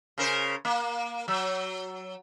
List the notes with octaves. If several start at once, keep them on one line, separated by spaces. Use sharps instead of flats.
C#3 A#4 C5
A#3
F#3